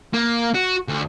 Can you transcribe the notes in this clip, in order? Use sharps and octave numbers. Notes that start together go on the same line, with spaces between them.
A#3
F#4
D2